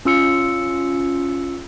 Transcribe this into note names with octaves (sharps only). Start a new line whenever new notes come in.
C#4 F4 E6 C#7